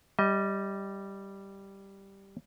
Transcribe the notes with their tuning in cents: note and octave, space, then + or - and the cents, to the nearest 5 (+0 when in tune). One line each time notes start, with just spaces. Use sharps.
G3 +0 D#5 +25